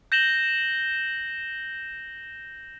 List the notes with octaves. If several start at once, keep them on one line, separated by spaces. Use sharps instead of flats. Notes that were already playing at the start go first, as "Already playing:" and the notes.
G6 A#6 E7 F#7 G7